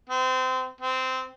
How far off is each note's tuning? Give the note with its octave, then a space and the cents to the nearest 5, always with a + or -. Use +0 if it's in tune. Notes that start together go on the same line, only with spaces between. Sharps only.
C4 -25
C4 -15